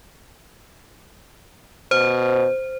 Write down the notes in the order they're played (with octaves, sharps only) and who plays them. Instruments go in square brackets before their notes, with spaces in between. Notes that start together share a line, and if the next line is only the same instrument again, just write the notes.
[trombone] B2 [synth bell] C5